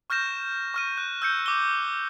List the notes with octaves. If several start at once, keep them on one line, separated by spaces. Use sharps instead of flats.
C#6 F6 G6 A#6 E7
C#6 F6 D#7
F#6
E6 G6 C#7
D6 G7